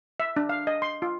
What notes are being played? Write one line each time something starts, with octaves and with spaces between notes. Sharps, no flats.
E5
D4
F5
D#5
C6
F4